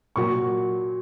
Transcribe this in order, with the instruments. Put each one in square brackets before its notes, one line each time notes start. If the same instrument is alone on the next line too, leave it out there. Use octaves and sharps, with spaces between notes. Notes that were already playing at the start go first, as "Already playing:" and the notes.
[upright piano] A#2 F#3 C#6